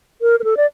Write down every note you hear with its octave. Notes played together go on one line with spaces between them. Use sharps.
A#4
A#4
A4
D5